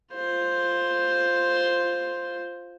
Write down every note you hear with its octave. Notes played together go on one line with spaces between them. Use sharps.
F4 C5